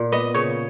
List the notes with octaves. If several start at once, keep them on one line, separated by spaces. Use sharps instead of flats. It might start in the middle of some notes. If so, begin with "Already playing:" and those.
Already playing: A#2
B3 D#5
C#3 C#5